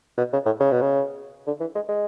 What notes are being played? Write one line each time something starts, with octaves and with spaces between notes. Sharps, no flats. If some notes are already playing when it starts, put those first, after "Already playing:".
B2
C#3
A2
C#3
B2
C#3
D3
E3
G#3
G#3